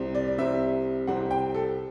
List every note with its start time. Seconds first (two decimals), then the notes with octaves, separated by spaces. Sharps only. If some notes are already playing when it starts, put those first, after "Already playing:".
Already playing: C2 C3 G3 C4
0.15 D5
0.28 D5
0.38 C2 C3 G3 C4 E5
1.07 C2 C3 G3 C4 F#5
1.31 G5
1.55 A4